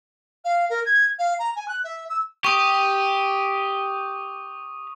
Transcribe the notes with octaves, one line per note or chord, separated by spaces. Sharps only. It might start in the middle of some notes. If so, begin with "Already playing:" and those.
F5
A#4
G#6
F5
A#5
G#5
F#6
E5
E6
G4 C#6 D#6